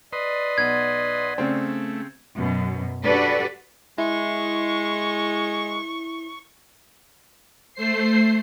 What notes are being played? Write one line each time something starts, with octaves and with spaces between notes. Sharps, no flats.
B4 D5 D#5 C6
B1 G#6
C#3 A3 C4
F#2 B2
D4 F#4 G4 A4 B4 D5
G#3 E4 C#6
A3 C5 C7